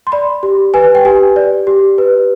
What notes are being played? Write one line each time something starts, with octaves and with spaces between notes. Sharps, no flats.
C6
D5 B5
G4
B4 G#5
G5
G4 G#5
D5
G4
B4